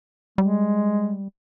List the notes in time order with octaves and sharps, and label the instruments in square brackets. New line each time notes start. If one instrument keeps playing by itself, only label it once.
[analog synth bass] G3 [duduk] G#3